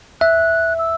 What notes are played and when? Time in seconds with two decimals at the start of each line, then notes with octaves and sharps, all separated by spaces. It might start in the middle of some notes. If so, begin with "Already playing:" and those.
0.21 E5 F#6
0.79 E6